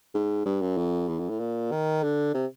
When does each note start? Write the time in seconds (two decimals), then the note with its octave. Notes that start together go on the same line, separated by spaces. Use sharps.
0.14 G#2
0.46 G2
0.61 F#2
0.77 F2
1.08 E2
1.19 F2
1.30 A2
1.40 A#2
1.71 D#3
2.03 D3
2.34 C3